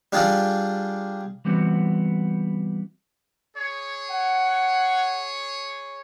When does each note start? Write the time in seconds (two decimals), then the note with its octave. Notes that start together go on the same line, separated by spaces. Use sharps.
0.12 G3 D4 F4 G#4 D5
1.45 E3 G3 B3 C4 F#4
3.57 G#4 C#5
4.11 F#5